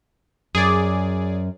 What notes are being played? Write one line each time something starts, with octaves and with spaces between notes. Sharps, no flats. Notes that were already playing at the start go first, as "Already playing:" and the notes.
F#2 G#4 D5